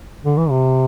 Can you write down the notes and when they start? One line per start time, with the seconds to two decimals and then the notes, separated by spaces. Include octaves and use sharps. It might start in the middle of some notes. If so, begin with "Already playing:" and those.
0.25 D3
0.37 E3
0.50 C3